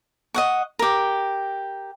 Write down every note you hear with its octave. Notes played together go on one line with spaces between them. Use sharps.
D#5 F#5 C#6
G4 A#4